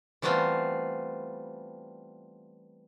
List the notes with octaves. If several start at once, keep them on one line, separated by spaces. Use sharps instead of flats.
E3 G3 A3 B3 C4 F4